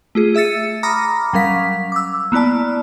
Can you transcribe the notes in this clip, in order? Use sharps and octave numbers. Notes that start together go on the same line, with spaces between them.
A3 F4 G#4
G#4 E5 E6 A6 C#7
A#5 B5 D6 D#6 F6 A#6
F#3 G3 C#4 A#4 F5 B6
D6 E6
A#3 B3 E4 D5 A5